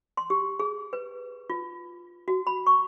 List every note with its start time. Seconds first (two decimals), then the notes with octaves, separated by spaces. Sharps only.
0.17 C6
0.30 G4
0.60 G#4
0.93 B4
1.50 F4
2.28 F#4
2.47 B5
2.66 C#6